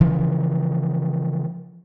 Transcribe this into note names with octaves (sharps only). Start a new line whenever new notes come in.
C#3 E3 F3